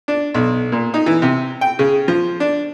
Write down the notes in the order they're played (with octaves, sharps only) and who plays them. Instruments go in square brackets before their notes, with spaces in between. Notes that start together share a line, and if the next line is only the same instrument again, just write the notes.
[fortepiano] D4
B1
A#2
D#4
E3
C3
G5
C#3
F3
D4